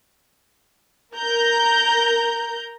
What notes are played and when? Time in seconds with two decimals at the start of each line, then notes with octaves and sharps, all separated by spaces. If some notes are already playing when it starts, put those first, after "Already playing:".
1.14 A#4 A#5 G6